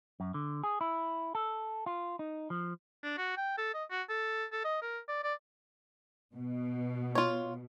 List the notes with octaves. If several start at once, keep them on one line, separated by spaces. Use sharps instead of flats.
F#2
D3
G#4
E4
A4
F4
D#4
F3
D4
F#4
G5
A4
D#5
F#4
A4
A4
D#5
A#4
D5
D5
B2
F4 C#5